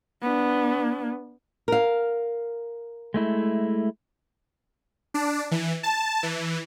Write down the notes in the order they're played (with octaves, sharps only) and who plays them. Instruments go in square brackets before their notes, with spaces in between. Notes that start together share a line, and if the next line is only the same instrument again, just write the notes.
[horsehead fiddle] B3 D4
[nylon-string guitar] A#4 F5
[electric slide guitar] G#3 A3 E4
[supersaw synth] D4
E3
A5
E3